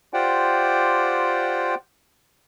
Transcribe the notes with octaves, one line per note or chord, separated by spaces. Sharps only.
F4 G4 C5 D5 F#5 G5